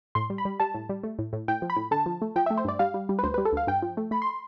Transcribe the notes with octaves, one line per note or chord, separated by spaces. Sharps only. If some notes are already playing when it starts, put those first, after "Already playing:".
A2 C6
G3
B5
G3
G3 A5
A2
G3
A3
A2
A2
A2 G5
F3
B5
A2
D3 A5
F3
A3
F3 G5
E5
A3
C5
G2 D5
G3 F5
G3
G3
B4
D2 C5
B4
G3
A4
D2 F5
G2 G5
F3
A3
A3 B5
C6